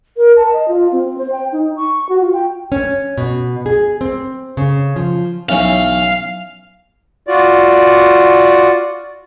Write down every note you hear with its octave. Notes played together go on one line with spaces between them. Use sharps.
A#4
A5
D#5
F4
C4
C5
G5
D#4
C#6
F#4
F4
G5
C#4
B2
G#4
C4
C#3
F3
B1 E3 C#4 F5
F4 F#4 D5